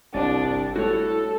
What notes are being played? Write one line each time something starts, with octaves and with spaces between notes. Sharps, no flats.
G1 C2 D4 D5 A6
A2 G3 A3 F#4 A4 C#5